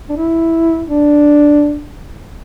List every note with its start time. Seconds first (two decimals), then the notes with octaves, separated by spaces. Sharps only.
0.09 D4
0.17 E4
0.89 D4